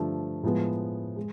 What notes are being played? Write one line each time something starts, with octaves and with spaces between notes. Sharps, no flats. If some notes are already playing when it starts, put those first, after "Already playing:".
Already playing: G2 D3 F3 A3
A2 F3 G#3 B3
G#3